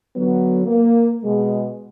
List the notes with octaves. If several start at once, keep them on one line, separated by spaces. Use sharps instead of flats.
D3 F#3 B3
A#3
B2 G#3